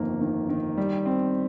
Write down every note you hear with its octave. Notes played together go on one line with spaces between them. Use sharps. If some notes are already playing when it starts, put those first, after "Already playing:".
Already playing: G1 F2 D#3 A#3
D#3
D#3
G3
C4